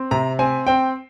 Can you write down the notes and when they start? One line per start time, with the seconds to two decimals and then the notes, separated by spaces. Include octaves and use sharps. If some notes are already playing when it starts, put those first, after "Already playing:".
Already playing: C4
0.11 C3 A#5
0.39 C4 G#5
0.67 C4 G5